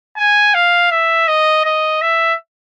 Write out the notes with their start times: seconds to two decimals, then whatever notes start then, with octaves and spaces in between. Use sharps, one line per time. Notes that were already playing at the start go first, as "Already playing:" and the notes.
0.17 G#5
0.54 F5
0.91 E5
1.28 D#5
1.65 D#5
2.02 E5